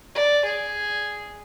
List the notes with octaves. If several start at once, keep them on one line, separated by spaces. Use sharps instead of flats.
D5
G#4